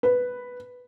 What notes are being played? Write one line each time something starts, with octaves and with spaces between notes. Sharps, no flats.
B4